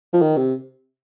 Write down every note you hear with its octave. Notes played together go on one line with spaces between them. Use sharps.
F3
D#3
C3